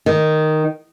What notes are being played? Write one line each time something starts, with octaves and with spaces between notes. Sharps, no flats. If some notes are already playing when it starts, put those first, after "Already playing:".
D#3